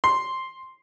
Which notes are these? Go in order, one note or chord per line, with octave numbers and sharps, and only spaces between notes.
C6